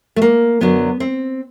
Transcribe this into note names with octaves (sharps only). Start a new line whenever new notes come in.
A3
A#3
F#2 D3 F#3 B3
C4